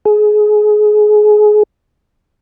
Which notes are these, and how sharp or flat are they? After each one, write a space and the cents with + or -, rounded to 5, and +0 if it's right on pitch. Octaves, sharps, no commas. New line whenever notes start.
G#4 +25